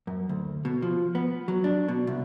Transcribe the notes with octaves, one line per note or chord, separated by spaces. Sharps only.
F#2
D2
B2
F3
B3
F#3
D4
B2
C2